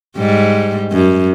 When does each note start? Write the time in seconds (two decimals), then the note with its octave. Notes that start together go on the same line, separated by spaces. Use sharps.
0.17 G#2 G3
0.92 F#2